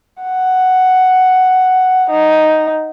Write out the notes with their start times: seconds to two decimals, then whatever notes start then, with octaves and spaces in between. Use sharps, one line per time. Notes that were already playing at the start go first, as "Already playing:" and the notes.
0.22 F#5
2.10 D#4